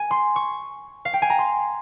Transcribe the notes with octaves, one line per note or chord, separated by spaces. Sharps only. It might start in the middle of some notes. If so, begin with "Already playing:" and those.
Already playing: G#5
C6
C#6
F5
G5
G#5
A#5
C6